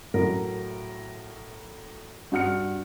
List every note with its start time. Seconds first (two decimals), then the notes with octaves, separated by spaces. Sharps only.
0.14 A2 F#3 A#4
2.32 G2 F#4 F#5 F6 C#7